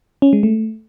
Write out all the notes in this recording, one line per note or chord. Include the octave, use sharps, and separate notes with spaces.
C#4
G#3
A3